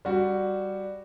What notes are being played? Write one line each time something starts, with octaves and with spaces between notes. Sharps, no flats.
G3 F#4